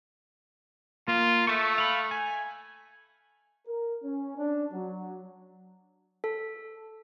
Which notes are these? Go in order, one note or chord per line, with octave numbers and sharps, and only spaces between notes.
A#3 F4
A3 E5 A5 C#6
F5 B5
G#5
A#4
C#4
D4
F#3
A4